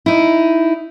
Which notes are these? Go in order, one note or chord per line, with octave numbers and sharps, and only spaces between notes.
D#4 E4